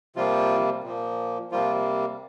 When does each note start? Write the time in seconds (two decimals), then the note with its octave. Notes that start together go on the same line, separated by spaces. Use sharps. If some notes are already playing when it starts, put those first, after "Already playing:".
0.16 C3 F3 G3 A#3 F4
0.84 A#2 F3 A#3
1.51 C3 F3 G3 A#3 F4